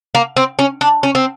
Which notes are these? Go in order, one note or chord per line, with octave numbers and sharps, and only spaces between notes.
A#3
C4
C#4
D4
C#4
C4